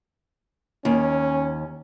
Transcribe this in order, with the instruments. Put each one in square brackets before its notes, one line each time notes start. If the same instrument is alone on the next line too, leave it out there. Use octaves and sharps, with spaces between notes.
[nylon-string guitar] D#2 [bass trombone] C#4